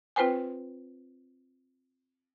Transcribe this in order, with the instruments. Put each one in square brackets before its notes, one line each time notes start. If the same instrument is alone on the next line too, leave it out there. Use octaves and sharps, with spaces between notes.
[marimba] C4 F4 B4 C5 G5 G#5